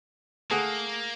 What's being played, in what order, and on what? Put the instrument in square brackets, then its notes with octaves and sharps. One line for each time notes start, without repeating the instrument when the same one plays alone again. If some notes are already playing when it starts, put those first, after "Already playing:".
[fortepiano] A3 G#4 F#5 [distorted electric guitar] A#3